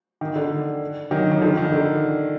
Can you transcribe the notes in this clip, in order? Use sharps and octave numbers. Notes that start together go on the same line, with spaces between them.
D#3
D3
D#3 F#3
D#3
D3 F3
D#3
D3